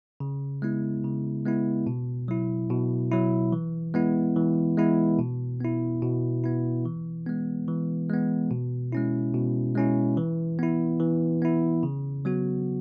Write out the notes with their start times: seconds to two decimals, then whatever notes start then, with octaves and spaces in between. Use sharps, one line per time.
0.20 C#3
0.62 G#3 B3 E4
1.04 C#3
1.45 G#3 B3 E4
1.87 B2
2.28 F#3 E4
2.70 B2
3.12 F#3 E4
3.52 E3
3.94 G#3 B3 E4
4.36 E3
4.77 G#3 B3 E4
5.19 B2
5.61 B3 E4
6.02 B2
6.44 B3 E4
6.85 E3
7.26 G#3 B3
7.68 E3
8.10 G#3 B3
8.51 B2
8.92 G#3 C#4 E4
9.34 B2
9.75 G#3 C#4 E4
10.17 E3
10.59 B3 E4
11.00 E3
11.42 B3 E4
11.83 C#3
12.25 F#3 B3 F#4